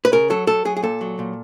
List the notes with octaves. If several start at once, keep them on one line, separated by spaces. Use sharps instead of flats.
B4
C#3 A#4
F#3 A4
F#3 A4
F#3 G#4
G#4
A#2 A4
F#3
A#2